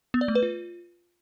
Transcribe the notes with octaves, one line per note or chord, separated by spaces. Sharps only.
B3
D5
A3
B4
F4